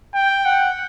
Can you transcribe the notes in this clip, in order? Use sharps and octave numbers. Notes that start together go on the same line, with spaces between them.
G5
F#5